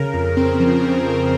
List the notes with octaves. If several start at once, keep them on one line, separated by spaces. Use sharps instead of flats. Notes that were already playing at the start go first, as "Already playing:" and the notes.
Already playing: C#3 A#4
F2
C4
F3
C#3
F2